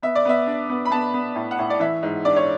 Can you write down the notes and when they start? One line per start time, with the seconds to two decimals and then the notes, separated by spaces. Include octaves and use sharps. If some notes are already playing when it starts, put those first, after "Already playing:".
0.03 B3 E5
0.15 D5
0.25 B3 E5
0.47 D4
0.70 B3
0.85 B5
0.91 B3 A5
1.14 B3
1.35 A2
1.51 F#5
1.59 A2
1.70 D5
1.80 E3 E5
2.03 G#2
2.25 D4 D5
2.36 C#5